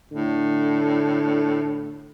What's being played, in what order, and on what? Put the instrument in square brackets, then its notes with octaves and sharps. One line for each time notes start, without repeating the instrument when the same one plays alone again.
[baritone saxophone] A2 [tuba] D3